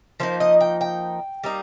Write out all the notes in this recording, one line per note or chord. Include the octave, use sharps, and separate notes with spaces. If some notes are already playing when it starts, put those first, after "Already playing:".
F3 A#3 D#4 C5
D#5
G5
G5
G3 A#3 D#4